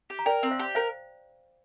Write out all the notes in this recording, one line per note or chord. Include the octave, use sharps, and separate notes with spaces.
G4
A#5
A#4 D5 G5
C4
C5 F5
G4
A#4 C5 F5